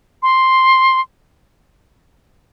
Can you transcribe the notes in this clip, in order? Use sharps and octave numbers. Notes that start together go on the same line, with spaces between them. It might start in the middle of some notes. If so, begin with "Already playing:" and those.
C6